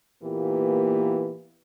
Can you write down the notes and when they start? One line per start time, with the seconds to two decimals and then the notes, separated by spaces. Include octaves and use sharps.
0.23 A#2 E3 A#3 B3 G4